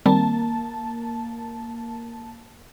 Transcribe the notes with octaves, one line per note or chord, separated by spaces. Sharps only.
D#3 G3 A#3 C4 A5